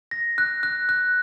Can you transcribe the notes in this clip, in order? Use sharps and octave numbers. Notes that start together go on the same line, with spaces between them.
A#6
F#6
F#6
F#6